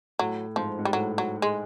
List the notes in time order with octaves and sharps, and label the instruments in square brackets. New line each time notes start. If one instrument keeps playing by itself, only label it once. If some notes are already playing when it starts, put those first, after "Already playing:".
[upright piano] A2 [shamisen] F#3
[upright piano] G#2 [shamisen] F3
[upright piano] G#2
[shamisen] G3
[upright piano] A2 [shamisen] F#3
[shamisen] F#3
G#3